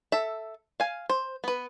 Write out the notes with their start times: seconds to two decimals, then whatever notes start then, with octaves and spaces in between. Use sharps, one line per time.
0.12 A4 E5
0.80 F5 G#5
1.10 C5
1.44 B3 B4